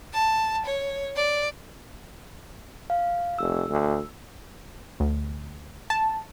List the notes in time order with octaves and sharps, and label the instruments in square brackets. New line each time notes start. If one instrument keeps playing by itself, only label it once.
[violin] A5
C#5
D5
[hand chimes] F5
[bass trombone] F1 [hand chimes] E6
[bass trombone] D2
[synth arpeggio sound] D2
A5